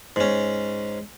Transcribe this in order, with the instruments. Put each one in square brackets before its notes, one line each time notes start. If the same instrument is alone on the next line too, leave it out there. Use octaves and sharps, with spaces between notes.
[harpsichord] G#2 C#4